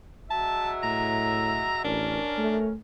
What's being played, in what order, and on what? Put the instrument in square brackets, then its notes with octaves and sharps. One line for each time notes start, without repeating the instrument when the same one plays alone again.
[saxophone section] F#3 G#3 E5 [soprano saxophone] A5
[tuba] A2 [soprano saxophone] A#5
[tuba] A1 [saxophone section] C#4 A#4 [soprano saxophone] D4
[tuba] A3